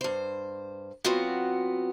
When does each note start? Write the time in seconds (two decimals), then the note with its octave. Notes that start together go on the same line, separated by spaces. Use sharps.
0.01 G2 C5
1.04 F#3 B3 C4 F4 F#4